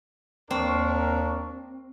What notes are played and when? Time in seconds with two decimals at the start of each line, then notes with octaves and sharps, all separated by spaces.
0.51 D#2 C4 D4 A#4 C#6